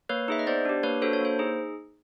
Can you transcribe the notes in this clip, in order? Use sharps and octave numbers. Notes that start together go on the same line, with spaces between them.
A#3 B4 C#5
D#4 G#4 E5
D#5
B3 C5 D5
D4 G4
A#3 B4 C#5
D4 F#4 A4 C5
C#5
A#3 C5
D#4 G#4